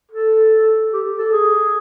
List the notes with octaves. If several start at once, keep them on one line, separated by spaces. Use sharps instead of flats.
A4
G4
A4
G#4